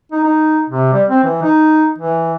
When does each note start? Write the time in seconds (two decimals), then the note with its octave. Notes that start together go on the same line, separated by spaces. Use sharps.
0.12 D#4
0.24 D#4
0.69 C3
0.93 G3
1.08 C4
1.24 E3
1.42 D#4
1.98 E3